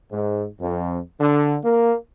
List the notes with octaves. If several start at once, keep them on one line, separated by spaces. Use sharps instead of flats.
G#2
F2
D3
A#3